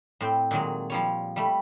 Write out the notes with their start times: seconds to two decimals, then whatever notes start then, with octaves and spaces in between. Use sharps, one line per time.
0.21 A2 C4 G5
0.51 A#2 D#3 F#3 G#3
0.90 F3 G3 C#5
1.36 G3 A3 B5